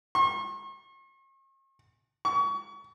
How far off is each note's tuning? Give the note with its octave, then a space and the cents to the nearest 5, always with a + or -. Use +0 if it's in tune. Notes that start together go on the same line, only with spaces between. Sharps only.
C#6 -45
C#6 +30